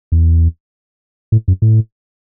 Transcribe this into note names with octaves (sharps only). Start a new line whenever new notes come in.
E2
A2
F#2
A2